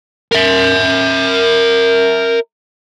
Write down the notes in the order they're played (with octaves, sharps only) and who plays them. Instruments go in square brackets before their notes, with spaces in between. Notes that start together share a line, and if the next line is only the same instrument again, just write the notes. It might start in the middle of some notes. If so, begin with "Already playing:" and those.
[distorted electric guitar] A#4 E5